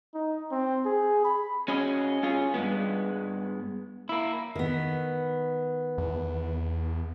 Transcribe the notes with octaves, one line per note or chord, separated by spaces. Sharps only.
D#4
C4
G#4
B5
C#4 F#4 G#4 D#5
C#4 F4 G#4
G2 G#3 B3
A#3 E4
D#3 B3
E2